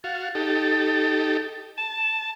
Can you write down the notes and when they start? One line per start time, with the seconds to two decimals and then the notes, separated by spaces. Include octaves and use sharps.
0.04 F#4 F5 A6
0.35 D#4 G4 A4
1.78 A5 E7